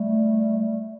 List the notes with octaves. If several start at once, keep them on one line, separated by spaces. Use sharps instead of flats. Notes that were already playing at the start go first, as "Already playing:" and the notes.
Already playing: G3 A3